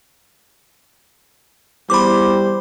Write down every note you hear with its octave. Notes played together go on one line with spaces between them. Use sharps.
E2 G3 C5 B5 D6